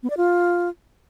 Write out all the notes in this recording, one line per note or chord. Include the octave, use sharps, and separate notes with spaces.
B3
D5
F4